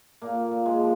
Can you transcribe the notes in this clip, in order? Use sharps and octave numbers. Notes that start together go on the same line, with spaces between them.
A#2 A#3
A#2
G#3
F3